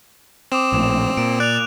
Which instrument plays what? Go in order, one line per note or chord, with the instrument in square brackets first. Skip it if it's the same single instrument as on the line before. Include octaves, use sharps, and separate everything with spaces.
[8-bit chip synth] C4 [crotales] D6 D#6 E7
[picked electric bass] A#1 A2
[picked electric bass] A#2 [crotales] D7
[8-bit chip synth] D5 [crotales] F#6 F7